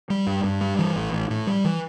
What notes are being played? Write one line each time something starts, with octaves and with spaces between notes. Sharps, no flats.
G3
G2
G2
G3
E3
A1
A1
A2
G3
E3